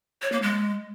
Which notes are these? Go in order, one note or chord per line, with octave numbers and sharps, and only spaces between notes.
C#5
A#3
G#3